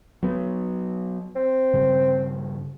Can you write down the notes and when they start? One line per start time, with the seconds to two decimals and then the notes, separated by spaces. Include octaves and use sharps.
0.23 F#3 B3
1.36 C4
1.74 G2 C#3